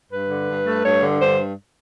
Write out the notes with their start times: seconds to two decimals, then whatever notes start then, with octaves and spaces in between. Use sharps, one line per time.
0.11 G2 B4
0.29 D3
0.48 G2
0.66 A3
0.83 G2 C#5
1.02 D3
1.20 G2 C5